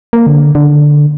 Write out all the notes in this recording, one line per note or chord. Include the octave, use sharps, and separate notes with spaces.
A#3
D3
D3